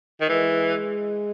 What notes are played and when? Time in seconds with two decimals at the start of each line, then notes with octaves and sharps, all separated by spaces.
0.21 D#3
0.29 E3 G#3